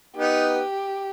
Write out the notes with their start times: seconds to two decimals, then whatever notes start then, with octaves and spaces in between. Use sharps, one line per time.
0.16 B3 D#4 G4